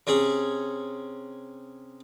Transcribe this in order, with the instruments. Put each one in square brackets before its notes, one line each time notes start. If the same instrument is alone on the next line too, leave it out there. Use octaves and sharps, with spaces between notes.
[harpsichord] C3 C#4 G#4